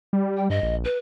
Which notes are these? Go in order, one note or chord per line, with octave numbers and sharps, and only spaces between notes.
G3
G5
G2 D#5
A#1
B4